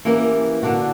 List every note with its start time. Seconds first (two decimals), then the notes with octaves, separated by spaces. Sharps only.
0.05 E3 A#3 C#4 G4 A#4
0.63 D3 A#3 D4 F#4